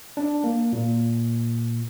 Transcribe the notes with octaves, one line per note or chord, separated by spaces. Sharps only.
D4
A#3
A#2